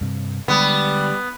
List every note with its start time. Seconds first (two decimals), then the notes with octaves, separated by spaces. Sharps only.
0.01 G2 C3
0.48 D3 G3 G#3 B3